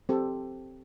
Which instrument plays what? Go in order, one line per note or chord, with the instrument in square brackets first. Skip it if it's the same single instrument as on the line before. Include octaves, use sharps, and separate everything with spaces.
[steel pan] C4 G4 A4